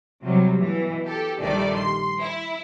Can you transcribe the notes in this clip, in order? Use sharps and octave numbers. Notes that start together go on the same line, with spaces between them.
C3 F#3 G3
B2 E3
G4 A4
A#1 D#3 G3 A3 D5
C6
E4